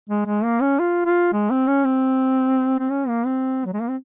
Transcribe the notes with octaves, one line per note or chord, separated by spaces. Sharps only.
G#3
G#3
A#3
C#4
F4
F4
G#3
C4
C#4
C4
C4
C#4
A#3
C4
F#3
G#3
A#3
C4